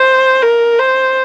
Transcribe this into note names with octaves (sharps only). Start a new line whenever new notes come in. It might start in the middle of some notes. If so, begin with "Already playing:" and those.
Already playing: C5
A#4
C5